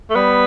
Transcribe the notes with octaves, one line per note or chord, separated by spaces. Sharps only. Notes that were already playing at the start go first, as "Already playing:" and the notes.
A3
G3 B3